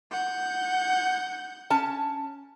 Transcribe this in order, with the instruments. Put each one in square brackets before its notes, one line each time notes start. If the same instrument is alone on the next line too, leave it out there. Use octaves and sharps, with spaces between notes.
[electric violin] F#5 G6
[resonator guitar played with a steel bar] C#4 A5